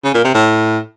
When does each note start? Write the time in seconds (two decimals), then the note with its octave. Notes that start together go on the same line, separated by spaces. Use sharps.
0.04 C#3
0.14 A#2
0.24 C3
0.34 A2